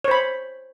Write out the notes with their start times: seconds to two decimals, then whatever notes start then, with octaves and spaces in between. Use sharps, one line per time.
0.04 C#5
0.08 C5
0.11 B5